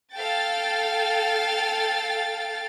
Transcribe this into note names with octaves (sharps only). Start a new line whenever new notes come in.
A4 F5 G5 A6